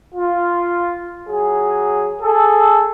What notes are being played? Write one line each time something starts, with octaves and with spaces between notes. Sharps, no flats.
F4
F#3 G#4
G#4 A4